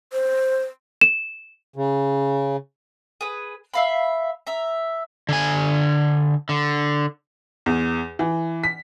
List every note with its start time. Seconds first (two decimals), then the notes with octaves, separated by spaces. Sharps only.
0.13 C5
1.01 E7
1.76 C#3
3.21 G#4 B4
3.74 E5 F5 B5
4.47 E5 A#5
5.29 D3 G#5
6.49 D3
7.66 E2
8.19 E3
8.64 B6